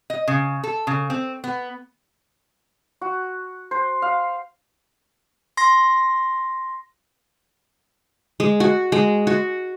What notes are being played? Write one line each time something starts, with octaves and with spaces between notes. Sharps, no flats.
D#5
C#3
A4
C#3
C4
B3
F#4
C5
F5
C6 A#6
G#3
F#4
G#3
F#4